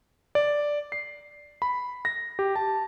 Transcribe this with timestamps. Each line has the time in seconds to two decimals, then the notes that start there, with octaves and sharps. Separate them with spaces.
0.35 D5
0.92 C7
1.62 B5
2.05 A#6
2.39 G4
2.56 A5